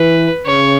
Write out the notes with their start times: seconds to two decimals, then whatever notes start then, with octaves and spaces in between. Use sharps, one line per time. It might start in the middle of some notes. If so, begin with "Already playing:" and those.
Already playing: E3 B4
0.46 C#3 C#5